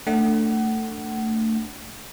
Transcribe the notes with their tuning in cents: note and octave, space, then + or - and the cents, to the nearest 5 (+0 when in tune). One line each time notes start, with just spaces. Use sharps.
A3 +20 D4 +0 F#5 +30